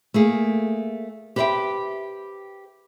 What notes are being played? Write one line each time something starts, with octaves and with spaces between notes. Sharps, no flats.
A3 A#3 G#4
G4 B4 C5 D#5 E5 G5